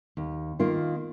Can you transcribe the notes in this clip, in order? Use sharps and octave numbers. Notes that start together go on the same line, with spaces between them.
D#2
D#3 A#3 F4